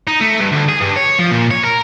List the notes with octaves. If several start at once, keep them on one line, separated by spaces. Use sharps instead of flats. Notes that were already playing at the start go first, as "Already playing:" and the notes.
D#4
A3
G2
D2
G#4
G2
C#5
F3
A#2
C#5
A#4